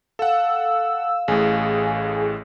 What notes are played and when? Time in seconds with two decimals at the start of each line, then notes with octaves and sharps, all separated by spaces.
0.19 A4 F5 F#5 E6
1.28 A1 A2 G#4